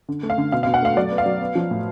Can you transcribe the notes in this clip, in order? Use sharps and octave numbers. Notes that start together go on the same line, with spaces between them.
D3
A3
F5
D3
B2 F5
B2 F5
F#5
A3 F5
F#3 D5
B3
F5
F#3
B3
F3
A2